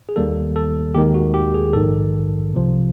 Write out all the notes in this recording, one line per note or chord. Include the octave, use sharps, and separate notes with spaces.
G#4
D#2 D#3 G3 A#3 A4
A4
D#2 D#3 G#3 G4
F#4
G4
G#4
A#1 G#2 D#3 A4
C2 C3 F3